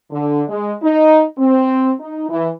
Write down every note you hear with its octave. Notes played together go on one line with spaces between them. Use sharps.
D3
G#3
D#4
C4
D#4
E3